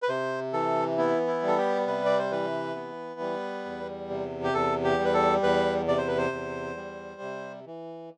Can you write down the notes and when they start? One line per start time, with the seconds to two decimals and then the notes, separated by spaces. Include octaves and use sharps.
0.03 B4
0.09 C3 C5
0.53 E3 A4
0.98 B3 E4
1.27 E4
1.42 G3
1.47 A4
1.57 G4
1.87 C3 B4
2.05 D5
2.19 C5
2.31 E3 B4
2.76 B3
3.20 G3
3.65 E2
4.10 C3
4.44 G4
4.54 E2 A4
4.84 G4
4.99 G3
5.05 B4
5.14 A4
5.43 E2 B4
5.88 C3 D5
5.98 C5
6.08 B4
6.18 C5
6.32 E2
6.76 G3
7.21 C3
7.66 E3